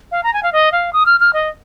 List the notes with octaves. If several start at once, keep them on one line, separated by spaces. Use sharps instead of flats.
F5
A#5
G#5
F5
D#5
F5
D#6
F6
F6
D#5